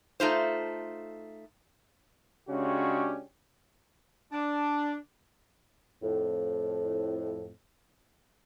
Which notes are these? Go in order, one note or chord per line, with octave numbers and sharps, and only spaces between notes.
A3 D#4 F4 C5
C#3 G#3 C#4 D4 F#4 G4
D4
F2 A2